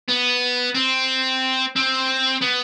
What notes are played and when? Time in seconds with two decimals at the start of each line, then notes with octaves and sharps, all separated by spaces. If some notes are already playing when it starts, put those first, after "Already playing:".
0.08 B3
0.74 C4
1.76 C4
2.42 B3